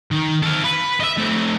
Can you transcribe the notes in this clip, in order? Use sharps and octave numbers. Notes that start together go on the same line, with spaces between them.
D#3
A4 F5
B4
D#5 E5
A3 C4